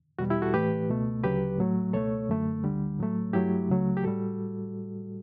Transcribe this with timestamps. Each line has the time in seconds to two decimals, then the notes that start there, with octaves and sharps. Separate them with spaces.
0.19 E2 B2 G3 F#4
0.30 E4 G4
0.42 F#4 A4
0.54 A2 E3 A3 G4 B4
0.89 C#2 B2 A3
1.24 D2 C#3 F#3 G4 B4
1.59 A2 F#3 A3
1.93 C#2 B2 A3 A4 C#5
2.29 F#2 D3 A3
2.64 D2 D3 G3
2.99 A2 F#3 A3
3.33 G2 F#3 A3 E4 G4
3.69 C#2 C#3 F#3 A3
3.97 G4
4.03 A2 G3 F#4 A4